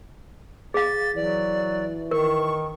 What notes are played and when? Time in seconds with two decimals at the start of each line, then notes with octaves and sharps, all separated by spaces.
0.74 G#4 F5 A6
1.16 E3 F#3 D5
2.11 D#3 A#4 C#6